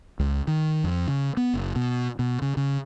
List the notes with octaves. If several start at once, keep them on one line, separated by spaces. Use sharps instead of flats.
C#2
D#3
F2
C#3
B3
F#1
B2
B2
C#3
C#3